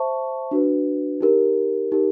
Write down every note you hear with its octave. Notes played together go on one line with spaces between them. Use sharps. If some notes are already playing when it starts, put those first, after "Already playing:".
Already playing: C5 E5 A5 C#6
D4 F#4 B4
D#4 G4 A#4
D#4 G4 A#4